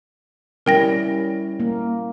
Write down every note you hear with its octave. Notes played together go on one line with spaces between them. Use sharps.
G3 C#4 E4 A#4 G5 A#6
A#3